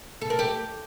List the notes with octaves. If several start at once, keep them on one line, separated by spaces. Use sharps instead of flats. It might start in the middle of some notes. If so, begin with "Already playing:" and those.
A4
A#4
G4